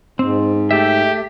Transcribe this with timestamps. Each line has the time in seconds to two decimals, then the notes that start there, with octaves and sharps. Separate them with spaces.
0.19 G#2 C4
0.71 A3 G4 E5